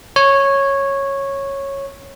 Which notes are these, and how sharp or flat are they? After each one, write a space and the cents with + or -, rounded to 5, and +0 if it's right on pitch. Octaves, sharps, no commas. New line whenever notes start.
C#5 -10